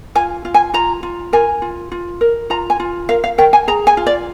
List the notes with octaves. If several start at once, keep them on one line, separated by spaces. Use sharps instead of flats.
F4 G#5
F4
G#5
F4 A#5
F4
A#4 G#5
F4
F4
A#4
F4 A#5
G#5
F4
A#4 F5
F5
A#4 G5
G#5
G#4 A#5
G#5
F4
D5